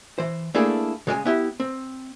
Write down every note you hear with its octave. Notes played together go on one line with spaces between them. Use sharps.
E3 C5
A3 A#3 D4 E4 G#4 A4
C#3 G#3 D5 G#5
B3 E4 G4
C4